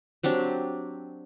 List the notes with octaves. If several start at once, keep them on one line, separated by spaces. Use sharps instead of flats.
F#3 C4 D4 G4